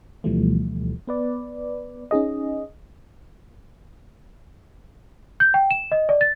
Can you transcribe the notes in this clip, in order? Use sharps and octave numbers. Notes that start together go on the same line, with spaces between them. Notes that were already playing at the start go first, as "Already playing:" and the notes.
D2 B2 E3 F3 G3 A3
B3 B4 D5
C#4 D#4 G#4 D#5
G6
G5
E7
D#5
D5
A6